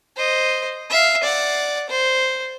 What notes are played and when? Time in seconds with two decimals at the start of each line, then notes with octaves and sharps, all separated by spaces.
0.16 C5 D#5
0.90 E5 F5
1.23 D5 F#5
1.89 C5